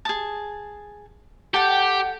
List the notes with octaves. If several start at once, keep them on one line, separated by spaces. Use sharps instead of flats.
G#4 A5
G4 A4 F#5 G5